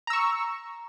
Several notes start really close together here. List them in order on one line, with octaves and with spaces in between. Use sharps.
A#5 E6 C#6